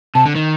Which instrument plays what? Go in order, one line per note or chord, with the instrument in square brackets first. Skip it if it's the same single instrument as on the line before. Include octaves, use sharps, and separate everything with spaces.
[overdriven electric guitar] C3 [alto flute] A5
[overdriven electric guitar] D3
D#3